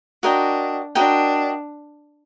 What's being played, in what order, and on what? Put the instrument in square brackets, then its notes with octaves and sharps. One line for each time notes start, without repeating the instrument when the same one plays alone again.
[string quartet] D4 [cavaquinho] F#4 A#4 D#5 G5
[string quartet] D4 [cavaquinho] F#4 A#4 D#5 G5